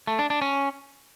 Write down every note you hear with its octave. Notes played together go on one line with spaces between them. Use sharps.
A3
D4
D4
C#4